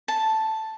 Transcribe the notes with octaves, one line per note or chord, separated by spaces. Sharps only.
A5